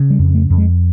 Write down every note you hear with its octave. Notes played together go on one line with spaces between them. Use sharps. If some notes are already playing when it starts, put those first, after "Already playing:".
Already playing: C#3
G3
F2
A3
F2
G#3